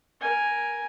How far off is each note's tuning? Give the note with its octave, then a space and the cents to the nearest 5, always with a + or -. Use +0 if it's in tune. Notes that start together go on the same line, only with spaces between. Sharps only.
A#4 +10 G#5 +0